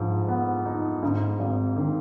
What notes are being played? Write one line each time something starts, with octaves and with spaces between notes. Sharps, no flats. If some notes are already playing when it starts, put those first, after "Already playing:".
Already playing: G#2 F3
B3
D#4
G#2
G#1
D#3